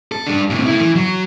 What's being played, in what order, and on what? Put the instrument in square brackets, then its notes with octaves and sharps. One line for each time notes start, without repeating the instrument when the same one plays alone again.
[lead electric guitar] A4
G3 D4
A2 C3
A3 E4
E3
F#3